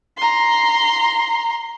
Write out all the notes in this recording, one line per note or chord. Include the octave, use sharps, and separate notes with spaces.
A#5 C6